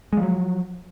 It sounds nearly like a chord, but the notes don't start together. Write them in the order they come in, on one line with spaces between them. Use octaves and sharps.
G#3 F3 F#3